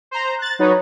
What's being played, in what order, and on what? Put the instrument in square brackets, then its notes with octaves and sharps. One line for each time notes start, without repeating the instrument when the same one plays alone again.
[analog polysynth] C5 A#5
F#6 A6
F#3 D#4 F#4 B4 C#5